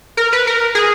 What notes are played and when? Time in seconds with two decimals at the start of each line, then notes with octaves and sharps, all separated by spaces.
0.17 A#4
0.33 B4
0.47 A#4
0.75 G#4